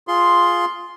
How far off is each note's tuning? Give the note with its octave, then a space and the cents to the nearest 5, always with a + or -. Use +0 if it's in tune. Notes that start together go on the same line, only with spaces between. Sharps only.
F4 +0 G#4 +0 C6 +0